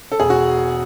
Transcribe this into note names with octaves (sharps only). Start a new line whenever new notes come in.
A4
E1 G#4
F#4